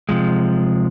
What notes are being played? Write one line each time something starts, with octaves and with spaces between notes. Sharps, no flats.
C3 F3 G#3